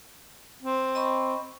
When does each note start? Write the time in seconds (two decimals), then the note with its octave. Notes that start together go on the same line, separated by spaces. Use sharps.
0.63 C4
0.95 D#5 B5 C#6